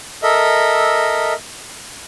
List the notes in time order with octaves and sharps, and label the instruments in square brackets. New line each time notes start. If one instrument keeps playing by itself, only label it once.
[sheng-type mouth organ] A4 A#4 D#5 E5